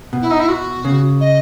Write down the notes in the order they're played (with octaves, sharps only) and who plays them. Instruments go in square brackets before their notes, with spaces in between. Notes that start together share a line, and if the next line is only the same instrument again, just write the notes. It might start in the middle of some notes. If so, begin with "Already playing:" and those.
[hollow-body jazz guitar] B2
[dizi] E4
D#4
E4
F#4
[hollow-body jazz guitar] C#3
[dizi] D#5